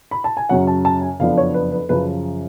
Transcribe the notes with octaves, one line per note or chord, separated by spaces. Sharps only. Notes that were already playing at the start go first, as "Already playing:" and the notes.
B5
A5
G#5
F#2 C#3 F#3 C#4 F#5
A5
A5
G#5
F#1 F2 F3 B3 D4 F5
C#5
B4
B4
F#2 C#3 F3 B4